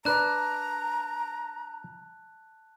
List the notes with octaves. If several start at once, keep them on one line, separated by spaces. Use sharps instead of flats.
D4 B4 D5 A5 A#5 F#6